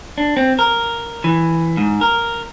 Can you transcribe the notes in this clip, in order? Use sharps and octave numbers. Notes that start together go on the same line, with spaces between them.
D4
C4
A#4
E3
G#2
A#4